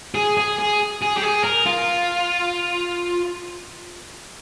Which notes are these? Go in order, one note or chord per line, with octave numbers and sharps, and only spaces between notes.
G#4
G#4
G#4
G#4
G4
G#4
A#4
F4